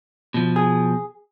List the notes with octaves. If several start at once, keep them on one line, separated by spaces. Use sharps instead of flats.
B2 F3
G#4